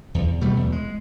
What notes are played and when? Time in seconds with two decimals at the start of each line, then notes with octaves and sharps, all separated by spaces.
0.15 E2
0.41 B2 G3 A3
0.57 E2
0.72 G#3